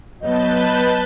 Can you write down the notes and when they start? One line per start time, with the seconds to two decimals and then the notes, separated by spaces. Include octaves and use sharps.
0.22 F#3 B3 B4 D#5 A5 G6